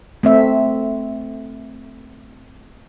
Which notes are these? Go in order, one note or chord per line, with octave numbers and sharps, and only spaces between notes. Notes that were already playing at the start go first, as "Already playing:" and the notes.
A3 C4 E5